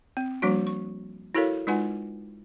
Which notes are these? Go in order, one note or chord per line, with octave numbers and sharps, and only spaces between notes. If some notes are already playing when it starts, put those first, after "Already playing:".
C4
F3 G3 A#3 D4 F#4
C#6
E4 F#4 A4 A#4 C#5 F5
G#3 D#4 F4 B4 F#5 G#5